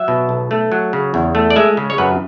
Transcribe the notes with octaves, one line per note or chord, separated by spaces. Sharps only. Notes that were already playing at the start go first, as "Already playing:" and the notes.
Already playing: F#3 E5
B2
B1
A3
F#3
C#3
E2
A3
D5
G#3 E5
C#3
C#5
F#2 B4